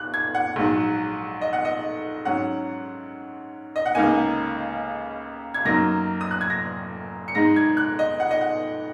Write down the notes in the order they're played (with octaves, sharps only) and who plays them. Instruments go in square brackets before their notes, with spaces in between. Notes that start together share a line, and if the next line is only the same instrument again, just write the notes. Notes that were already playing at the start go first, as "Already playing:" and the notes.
Already playing: [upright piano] D#2 F#6
G#6
F#5
A#1 G#2 F#3
D#5
F#5
D#5
G#2 F#3 C#4 F#5
D#5
F#5
C#2 C#3 A#3 D#4 G#5
G#6
F#2 F#3 A#3 D#4 A#6
D#6
F#6
G#6
A#6
C#7
G#2 G#3 D#4 A#6
G#6
F#6
D#5
F#5
D#5
F#5